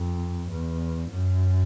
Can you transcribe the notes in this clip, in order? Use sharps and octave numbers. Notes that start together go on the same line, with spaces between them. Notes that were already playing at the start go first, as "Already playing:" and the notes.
Already playing: F2
E2
F#2